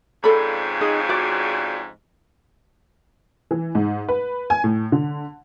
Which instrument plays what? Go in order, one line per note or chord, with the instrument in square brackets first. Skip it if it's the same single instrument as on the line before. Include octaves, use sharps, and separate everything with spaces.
[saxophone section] F2 G#2 C#3 [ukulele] A4 D5 B5
[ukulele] D#4 G#4 D#5
F#4 D5
[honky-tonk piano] E3
G#2
B4
G#5
A2
D3